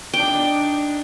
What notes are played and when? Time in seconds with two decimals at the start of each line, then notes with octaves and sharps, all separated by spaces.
0.13 D4 D#4 G5